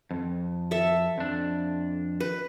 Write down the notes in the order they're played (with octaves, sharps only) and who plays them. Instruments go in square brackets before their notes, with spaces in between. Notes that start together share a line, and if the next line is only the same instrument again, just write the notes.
[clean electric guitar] F2
[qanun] A4 E5
[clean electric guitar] F2 D4
[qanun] B4